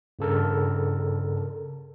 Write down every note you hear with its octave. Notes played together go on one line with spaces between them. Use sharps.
G2 C#3 A4 A#4